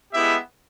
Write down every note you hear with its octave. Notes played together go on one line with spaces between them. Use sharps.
G#3 B3 E4 G4 E5